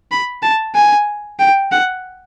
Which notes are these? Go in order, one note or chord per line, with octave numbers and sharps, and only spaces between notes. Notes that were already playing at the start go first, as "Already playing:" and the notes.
B5
A5
G#5
G5
F#5